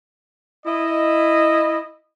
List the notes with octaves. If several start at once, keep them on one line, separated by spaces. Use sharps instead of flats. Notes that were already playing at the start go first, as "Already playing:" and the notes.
E4 D#5